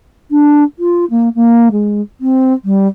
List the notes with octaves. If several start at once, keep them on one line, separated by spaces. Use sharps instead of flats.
D4
F4
A#3
A#3
G#3
C4
G3